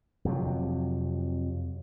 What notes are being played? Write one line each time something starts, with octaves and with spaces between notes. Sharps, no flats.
F2 C3 F#3